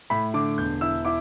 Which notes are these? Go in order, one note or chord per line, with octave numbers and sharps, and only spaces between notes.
A2 B5
D3 D6
E1 G6
E4 E6
E4 D6